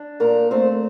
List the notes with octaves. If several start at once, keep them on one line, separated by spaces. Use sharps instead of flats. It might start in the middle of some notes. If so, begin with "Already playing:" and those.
Already playing: D4
A#2 A#3 A#4
A3 C4 C5